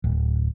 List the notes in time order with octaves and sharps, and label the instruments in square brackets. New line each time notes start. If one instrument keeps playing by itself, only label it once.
[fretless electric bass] D1